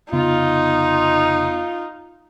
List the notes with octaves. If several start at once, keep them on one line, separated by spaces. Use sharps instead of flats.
F1 C#3 B3 D#4 F4